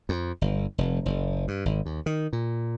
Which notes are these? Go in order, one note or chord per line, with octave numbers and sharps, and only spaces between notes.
F2
G1
F1
F#1
G2
G#1
D#2
D#3
A#2